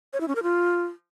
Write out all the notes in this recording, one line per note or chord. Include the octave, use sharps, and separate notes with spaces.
C#5
E4
C#4
A#4
F4